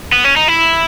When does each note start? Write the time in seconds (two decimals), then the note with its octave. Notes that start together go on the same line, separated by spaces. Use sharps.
0.13 B3
0.25 C#4
0.36 D#4
0.48 E4